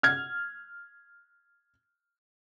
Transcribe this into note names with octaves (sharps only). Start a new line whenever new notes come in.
F6 G#6